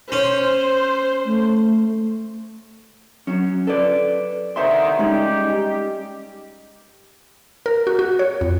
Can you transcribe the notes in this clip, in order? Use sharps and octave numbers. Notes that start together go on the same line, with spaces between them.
C#4 C5
A3
F#3 C#4
A4 B4 D5
C2 D3 D#3 C5 E5 C6
G3 G#3 C#4 D#4 G4
G4
A#4
F#4
F#4
C#5
F2